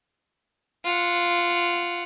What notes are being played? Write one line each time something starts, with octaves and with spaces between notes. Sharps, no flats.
F4 F#5